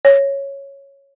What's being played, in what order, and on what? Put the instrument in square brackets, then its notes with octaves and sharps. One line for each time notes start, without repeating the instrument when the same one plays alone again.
[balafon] C#5